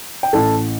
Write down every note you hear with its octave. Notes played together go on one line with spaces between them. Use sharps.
G5
A1 A4 A5